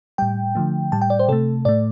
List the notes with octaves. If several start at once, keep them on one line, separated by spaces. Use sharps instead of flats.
A2 G3 G5
D3 F3 A3
A2 G3 A5
G5
D5
C5
C3 A3 A4
A2 A3 D5